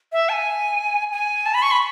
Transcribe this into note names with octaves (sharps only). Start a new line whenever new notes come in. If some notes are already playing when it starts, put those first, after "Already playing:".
E5
A5
G#5
G#5
A5
B5
C#6
B5